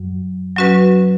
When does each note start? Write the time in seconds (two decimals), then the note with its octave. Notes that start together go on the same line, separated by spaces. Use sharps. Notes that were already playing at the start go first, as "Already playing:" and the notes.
Already playing: F#2 F#3
0.57 F#3 C#4 F#4 B4